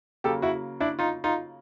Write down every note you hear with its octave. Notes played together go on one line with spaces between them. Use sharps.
C#3 F#3 A#3 G4 A4
E4 F#4
D4 E4
D#4 F4
D#4 F4